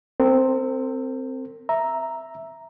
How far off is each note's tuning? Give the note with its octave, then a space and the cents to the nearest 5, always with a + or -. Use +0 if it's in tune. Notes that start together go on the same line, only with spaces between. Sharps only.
C4 +0 A#4 -45
E5 +0 A#5 +0